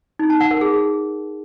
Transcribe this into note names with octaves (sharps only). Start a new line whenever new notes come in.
D#4
A5
F#5
A#4
G#4